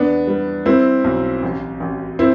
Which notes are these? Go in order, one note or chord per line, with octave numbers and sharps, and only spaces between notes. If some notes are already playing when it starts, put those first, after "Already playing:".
Already playing: E2 E3 B3 D4
G3
G3 C4 E4
B1
A1
A1
C4 E4